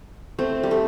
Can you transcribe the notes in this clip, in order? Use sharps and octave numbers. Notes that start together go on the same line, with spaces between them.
A3 C4
G3
A3